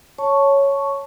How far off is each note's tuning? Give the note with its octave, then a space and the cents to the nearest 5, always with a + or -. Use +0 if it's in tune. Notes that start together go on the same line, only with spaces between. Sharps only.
C#5 +0 A5 +0 C#6 +0